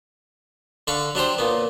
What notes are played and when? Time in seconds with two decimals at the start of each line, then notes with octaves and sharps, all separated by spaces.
0.87 D3 F5 B5 C#6
1.15 F#3 D4 G4 C5
1.38 A#2 B3